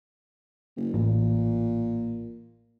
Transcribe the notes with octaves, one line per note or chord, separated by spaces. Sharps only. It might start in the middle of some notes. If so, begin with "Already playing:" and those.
F#1
A1 A#2